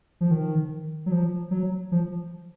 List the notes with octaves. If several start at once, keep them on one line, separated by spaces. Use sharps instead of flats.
F3
D#3
F#3
F3
F#3
F3